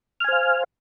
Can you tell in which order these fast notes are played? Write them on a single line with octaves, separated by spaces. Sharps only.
F6 G#5 C5 F5